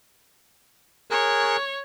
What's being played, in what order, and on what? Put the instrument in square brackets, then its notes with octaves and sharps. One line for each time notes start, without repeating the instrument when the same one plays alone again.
[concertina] G#4 A#4 F#6 [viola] C#5